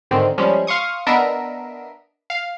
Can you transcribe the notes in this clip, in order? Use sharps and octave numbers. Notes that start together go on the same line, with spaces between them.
G#2 D3 D#3 C4
F3 G3 G#3 C#4
F5 C6 C#6 D#6
B3 D4 A#4 D#5 E5
F5